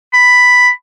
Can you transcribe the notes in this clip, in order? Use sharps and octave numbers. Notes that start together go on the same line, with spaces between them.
B5